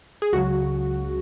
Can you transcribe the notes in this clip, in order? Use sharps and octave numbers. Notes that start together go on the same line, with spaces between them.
G#4
C#2 C#3 F#3 F#4